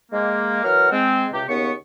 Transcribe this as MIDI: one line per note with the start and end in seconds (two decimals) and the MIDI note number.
0.12 0.59 56
0.12 0.59 58
0.64 0.90 52
0.64 0.90 54
0.64 0.90 70
0.64 0.90 78
0.64 0.90 89
0.91 1.26 56
0.91 1.26 60
1.33 1.43 37
1.33 1.43 48
1.33 1.43 67
1.48 1.72 39
1.48 1.72 49
1.48 1.72 59
1.48 1.72 85